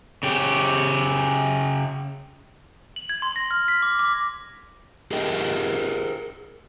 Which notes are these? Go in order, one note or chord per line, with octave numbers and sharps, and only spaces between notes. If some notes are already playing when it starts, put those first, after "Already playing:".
C#3 G4
F#7
G#6
C6
A#6
F6
B6
D6
D6
G4 G#4 A#4 D#5 G5